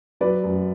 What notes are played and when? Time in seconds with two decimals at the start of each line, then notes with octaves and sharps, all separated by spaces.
0.21 F#3 B4 D5
0.44 F#2